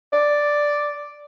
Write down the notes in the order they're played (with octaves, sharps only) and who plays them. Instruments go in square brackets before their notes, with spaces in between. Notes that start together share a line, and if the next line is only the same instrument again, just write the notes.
[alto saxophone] D5